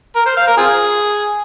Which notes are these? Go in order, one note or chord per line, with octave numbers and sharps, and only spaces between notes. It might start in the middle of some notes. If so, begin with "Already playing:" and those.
A#4
C5
F5
A#4
C4 F4 G#4